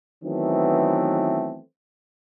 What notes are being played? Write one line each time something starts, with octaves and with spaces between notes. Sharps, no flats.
D#3 E3 F#3 A3 B3 C4